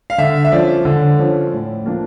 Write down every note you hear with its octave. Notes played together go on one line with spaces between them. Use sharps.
F5
D3 E5
E5
F3 C#4 D5
D3
F3 C#4
A2
F3 A#3 D4